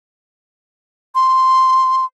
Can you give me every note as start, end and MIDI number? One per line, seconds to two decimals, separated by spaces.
1.15 2.05 84